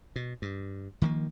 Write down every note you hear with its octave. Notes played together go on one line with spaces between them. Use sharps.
B2
G2
D#3 F3 G#3 A#3